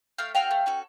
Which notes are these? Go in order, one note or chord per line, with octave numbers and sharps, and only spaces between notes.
A3 F5 G5
C#4 F#4 A4 F5 G5
A3
C#4 F#4 A4